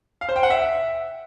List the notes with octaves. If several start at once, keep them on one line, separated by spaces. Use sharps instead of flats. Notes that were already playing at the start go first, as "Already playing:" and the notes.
F5
C5
G5
F#5
E5